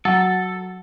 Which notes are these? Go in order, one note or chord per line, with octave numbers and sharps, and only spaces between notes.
F#3 A4